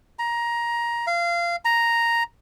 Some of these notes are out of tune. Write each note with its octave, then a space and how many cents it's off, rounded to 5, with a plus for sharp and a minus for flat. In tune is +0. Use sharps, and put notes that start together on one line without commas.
A#5 +15
F5 -20
A#5 +0